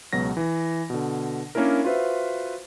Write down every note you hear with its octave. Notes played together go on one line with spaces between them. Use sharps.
C#2 B2 F#3 A#6
E3
B2 D3
A#3 C#4 D4 E4 A#4
F4 F#4 B4 C5 E5